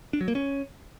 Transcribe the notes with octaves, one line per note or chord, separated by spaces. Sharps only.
D4
F#3
A#3
C#4